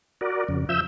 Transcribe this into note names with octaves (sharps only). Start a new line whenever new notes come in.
F#4 A#4 D5
F2 C#3
F3 E5 E6 G6